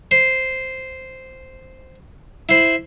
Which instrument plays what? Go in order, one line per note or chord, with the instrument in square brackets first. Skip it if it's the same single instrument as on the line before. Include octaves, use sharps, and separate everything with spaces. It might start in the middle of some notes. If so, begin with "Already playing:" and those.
[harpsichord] C5
E4 C5 B5